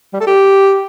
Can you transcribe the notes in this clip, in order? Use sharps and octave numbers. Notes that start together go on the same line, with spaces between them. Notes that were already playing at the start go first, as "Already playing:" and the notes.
G3
A4
G4